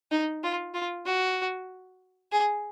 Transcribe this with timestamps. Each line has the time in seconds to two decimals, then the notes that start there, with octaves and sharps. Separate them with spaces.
0.11 D#4
0.44 F4
0.74 F4
1.06 F#4
2.32 G#4